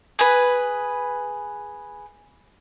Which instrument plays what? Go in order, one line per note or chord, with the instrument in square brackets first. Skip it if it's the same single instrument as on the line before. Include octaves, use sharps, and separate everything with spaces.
[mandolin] G#4 B4